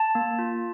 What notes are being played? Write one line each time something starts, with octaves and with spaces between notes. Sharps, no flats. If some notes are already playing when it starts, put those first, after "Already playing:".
Already playing: A5
A#3
F4